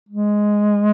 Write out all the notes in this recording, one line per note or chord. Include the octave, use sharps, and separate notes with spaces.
G#3